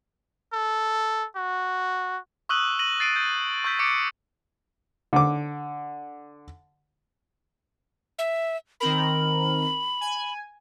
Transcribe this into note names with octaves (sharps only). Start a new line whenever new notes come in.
A4
F#4
C#6 D#6 E6 F#6 D#7 F#7
A#6 D#7 F#7
A6 C7 D7 D#7
G6
C#6 E6 G6 B6
C#6 D6 A6 C#7 D7
D3 D6
E5
D#3 C4 A#4 B5
G#5